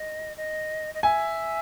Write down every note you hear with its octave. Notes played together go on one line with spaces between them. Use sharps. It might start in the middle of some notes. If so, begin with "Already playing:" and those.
Already playing: D#5
D#5
D#5
E5 G#5